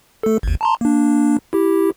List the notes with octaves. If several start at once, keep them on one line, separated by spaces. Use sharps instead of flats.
A3 A4
G#1 D#2
A5 A#5 C6
A#3 D4
E4 G4